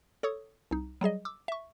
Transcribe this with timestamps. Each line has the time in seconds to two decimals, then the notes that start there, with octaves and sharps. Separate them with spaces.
0.23 A4 C#5 C#6 D#6
0.71 C2 D#4
1.01 F#3 G3 G#4 D#5
1.25 D6 E6
1.48 E5 C#6